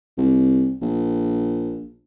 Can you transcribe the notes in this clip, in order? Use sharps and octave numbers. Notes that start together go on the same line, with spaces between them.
C2
A#1